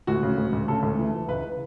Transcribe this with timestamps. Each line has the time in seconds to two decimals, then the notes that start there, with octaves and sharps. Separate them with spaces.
0.07 D2 F#4
0.23 C#3
0.38 D2
0.53 D2
0.68 C#3 A4
0.83 D2
0.99 E3
1.14 E3
1.28 C#2 B4